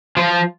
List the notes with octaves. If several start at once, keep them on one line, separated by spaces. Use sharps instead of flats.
F3 F4